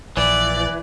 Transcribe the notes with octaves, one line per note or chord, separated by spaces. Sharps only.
A#1 E3 D5